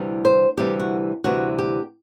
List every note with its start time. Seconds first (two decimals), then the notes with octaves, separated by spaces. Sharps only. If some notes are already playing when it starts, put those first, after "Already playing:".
Already playing: D2 C3 E3 G3
0.25 C5
0.57 D2 C3 E3 G3 G4
0.80 F#4
1.24 D2 C3 E3 G3 F#4
1.59 G4